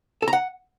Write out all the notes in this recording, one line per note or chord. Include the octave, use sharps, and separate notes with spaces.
A4
A#5
F#5